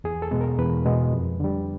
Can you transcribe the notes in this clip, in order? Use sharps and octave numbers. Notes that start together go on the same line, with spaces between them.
E2 G#4
A4
B2 G#3 B3
A#4
E2 B4
B2 G#3 B3
F2
D3 G3